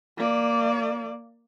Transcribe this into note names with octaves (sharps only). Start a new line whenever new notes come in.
A#3 D5